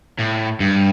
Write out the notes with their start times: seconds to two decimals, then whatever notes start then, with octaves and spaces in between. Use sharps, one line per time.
0.19 A2
0.60 G2